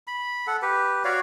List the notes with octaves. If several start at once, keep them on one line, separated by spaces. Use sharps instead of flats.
B5
A4 F#5
G4 B4
F#4 C#5 D5 F5